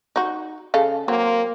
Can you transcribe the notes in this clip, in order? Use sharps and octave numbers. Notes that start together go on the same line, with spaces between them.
D#4 F#4
C#3 A4 F5
F#3 A#3 C4